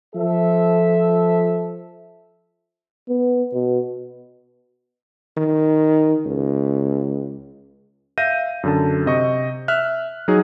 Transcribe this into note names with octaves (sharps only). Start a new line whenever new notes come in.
F3 A4 E5
B3
B2
D#3
C#2
E5 F5 G6 A#6 D#7
F#2 D3 A5
C3 D#5 C#6
E5 F6 F#6
F#3 D#4 G#4 C#5